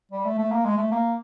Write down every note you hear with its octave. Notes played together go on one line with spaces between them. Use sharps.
G3
A3
A3
A#3
G#3
A3
A#3